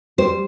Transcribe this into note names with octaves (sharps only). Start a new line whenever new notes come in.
G3 C5